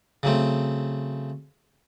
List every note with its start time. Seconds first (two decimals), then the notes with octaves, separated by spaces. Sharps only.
0.23 C#3 F#3 A3 C4